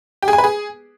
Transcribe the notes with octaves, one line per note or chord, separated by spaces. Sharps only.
G4
G#4
G#5
B4
G#4